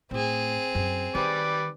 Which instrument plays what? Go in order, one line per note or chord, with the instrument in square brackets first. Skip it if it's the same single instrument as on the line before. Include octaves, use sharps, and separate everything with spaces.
[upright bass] A2 [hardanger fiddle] C4 G#4
[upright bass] F#2
[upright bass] D#3 [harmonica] G3 B4 D5